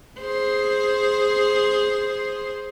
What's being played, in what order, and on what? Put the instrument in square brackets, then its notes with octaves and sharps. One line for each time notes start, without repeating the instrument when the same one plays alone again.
[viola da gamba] G#4 C5